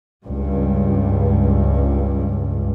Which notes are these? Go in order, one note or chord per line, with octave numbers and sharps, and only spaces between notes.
C#2 G2